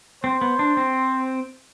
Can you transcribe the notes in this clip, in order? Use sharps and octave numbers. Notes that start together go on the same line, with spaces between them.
C4 C5
B3
D4
C4